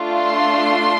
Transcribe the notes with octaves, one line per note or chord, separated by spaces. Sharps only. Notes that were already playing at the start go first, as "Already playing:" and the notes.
Already playing: A3 D4 F4
C6